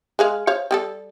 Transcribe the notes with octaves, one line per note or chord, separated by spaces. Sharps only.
G#3 G#4 F5
C5 C#5 F5
G3 G4 A4